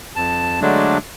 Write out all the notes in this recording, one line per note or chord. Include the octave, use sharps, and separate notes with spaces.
F2 A5
D3 F#3 G#3 A3 D4